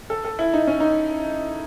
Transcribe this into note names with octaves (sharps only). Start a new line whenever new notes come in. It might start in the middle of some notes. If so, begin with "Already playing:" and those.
A4
A4
E4
D#4
C#4
D#4